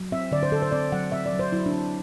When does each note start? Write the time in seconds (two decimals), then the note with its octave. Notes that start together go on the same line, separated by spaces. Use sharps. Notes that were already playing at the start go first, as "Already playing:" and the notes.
Already playing: F#3
0.12 C4 E5
0.32 D3 D5
0.43 C5
0.52 D3 A4
0.62 C5
0.72 C4 D5
0.92 F#3 F#5
1.12 C4 E5
1.26 D5
1.33 F#3
1.39 C5
1.52 F#3 E4
1.66 D4
1.72 C4